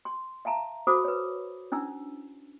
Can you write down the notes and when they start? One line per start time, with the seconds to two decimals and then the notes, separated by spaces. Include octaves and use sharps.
0.05 C6
0.45 E5 F5 A5 A#5
0.87 F#4 A4 C5 B5 D6 D#6
1.04 B4 C#5
1.72 C#4 D4 E4 E6